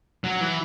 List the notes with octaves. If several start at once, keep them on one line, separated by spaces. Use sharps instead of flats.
F#3
E3